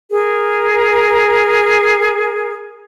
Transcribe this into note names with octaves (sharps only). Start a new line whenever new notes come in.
G#4 A#4